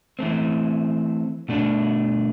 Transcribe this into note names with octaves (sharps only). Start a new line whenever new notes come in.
E3 A3 C4
B2 A3 D4